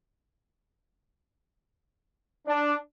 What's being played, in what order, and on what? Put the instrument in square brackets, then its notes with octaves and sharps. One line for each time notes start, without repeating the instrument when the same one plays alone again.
[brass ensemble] D4